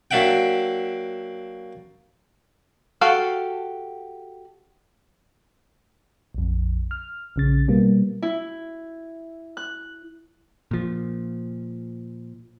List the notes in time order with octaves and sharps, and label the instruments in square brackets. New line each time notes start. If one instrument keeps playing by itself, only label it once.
[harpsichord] F#3 A#3 D4 E5 F#5 G5
[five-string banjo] F#4 G4 A4 F5 F#5
[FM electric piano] A#1 F2
F6
A#1 C#3 A6
B2 G3 A#3 B3
[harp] E4
F#6
[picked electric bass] A#2 F3